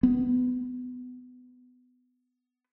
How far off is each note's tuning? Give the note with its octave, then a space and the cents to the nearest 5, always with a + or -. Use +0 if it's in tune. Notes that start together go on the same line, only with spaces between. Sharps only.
B3 +20